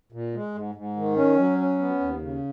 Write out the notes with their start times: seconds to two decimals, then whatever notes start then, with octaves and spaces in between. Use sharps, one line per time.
0.12 A#2
0.34 G#3
0.55 G#2
0.75 G#2
0.96 D#3
1.16 C#4
1.38 F#3
1.58 C#4
1.79 B3
2.00 D#2
2.21 C#3